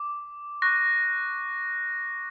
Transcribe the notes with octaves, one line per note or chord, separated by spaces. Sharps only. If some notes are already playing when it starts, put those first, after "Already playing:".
Already playing: D6
C#6 F#6 A#6